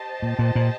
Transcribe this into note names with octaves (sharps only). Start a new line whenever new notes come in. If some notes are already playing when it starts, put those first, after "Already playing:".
Already playing: G4 C5 D#5 A5
A#2
A#2
A#2